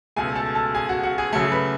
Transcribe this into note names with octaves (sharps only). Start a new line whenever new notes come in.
C#2 B2 A3 G#4 G#5
A4 A5
A4 A5
G#4 G#5
F#4 F#5
F#4 F#5
G#4 G#5
F#2 C#3 F#3 A3
B4 B5